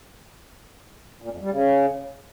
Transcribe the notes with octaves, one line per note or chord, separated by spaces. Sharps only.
A#2
F2
G3
C#3